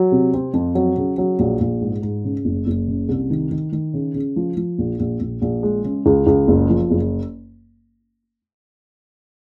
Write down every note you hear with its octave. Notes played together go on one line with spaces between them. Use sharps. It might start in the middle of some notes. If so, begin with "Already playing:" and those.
Already playing: F#3
C3
C4
F2
F#3
C#3
F#3
A#1
A#1
G#2
G#2
C#3
F#1
F#1
C#3
C2
D#3
D#3
D#3
C#3
C#3
F3
F3
A#1
A#1
A#1
A#1
G#3
C#3
C#2
C#2
F#1
F3
F#1